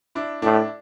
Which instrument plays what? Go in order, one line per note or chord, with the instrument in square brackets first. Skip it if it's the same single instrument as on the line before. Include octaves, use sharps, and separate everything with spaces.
[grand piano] D4 E4
[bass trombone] A2 [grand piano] D4 E4